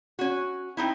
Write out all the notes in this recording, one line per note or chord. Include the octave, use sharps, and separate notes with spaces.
C#4 F#4
C4 D#4 E4